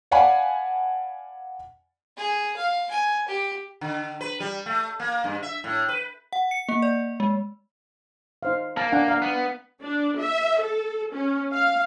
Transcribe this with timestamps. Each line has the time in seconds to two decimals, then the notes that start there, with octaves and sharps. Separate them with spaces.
0.11 D5 F5 F#5 G#5 A5 B5
2.17 G#4
2.56 F5
2.91 G#5
3.28 G4
3.81 D3
4.21 B4
4.40 G3
4.66 A3
5.00 A#3
5.24 G2
5.43 E5
5.64 A2
5.89 B4
6.33 F#5
6.51 C#7
6.69 A#3
6.82 D5
7.20 G#3
8.43 D#4 C5 F5
8.77 A#3 A5
8.92 D4 F#5 G#5
9.08 F5 A#5
9.22 B3
9.82 D4
10.20 E5
10.61 A4
11.13 C#4
11.52 F5